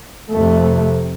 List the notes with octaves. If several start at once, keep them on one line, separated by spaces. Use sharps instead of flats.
F2 C3 A3